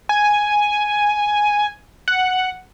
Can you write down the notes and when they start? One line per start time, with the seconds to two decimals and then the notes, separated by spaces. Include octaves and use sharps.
0.09 G#5
2.08 F#5